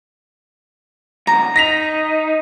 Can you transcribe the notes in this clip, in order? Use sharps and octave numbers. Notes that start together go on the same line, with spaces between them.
F#2 D3 A#5
D#4 A#6 B6 F7